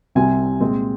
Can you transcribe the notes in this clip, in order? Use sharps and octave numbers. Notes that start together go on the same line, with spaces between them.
C2 C3 G3 C4 G#5
A#2 G#3 C4